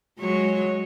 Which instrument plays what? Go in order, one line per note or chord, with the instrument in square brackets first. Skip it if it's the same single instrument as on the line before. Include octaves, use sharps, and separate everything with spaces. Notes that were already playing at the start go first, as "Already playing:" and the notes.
[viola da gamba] F#3 G#3 C#5